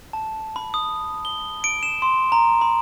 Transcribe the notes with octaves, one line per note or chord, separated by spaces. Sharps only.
A5
B5
D#6
G7
D7
E7
C6
A#5
B5